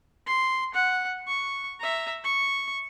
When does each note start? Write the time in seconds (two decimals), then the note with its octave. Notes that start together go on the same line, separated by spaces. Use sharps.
0.26 C6
0.74 F#5
1.28 C#6
1.80 E5 A#5
2.24 C#6